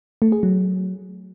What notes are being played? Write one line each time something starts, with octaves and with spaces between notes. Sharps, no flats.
A3
G#4
F#3